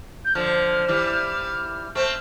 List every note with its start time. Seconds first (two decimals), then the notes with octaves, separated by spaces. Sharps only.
0.25 G6
0.35 D3 F3 F6
0.88 E3 G3
1.95 A3 C4 F6